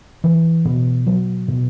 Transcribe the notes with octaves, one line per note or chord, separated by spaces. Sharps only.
E3
B2
F#3
B2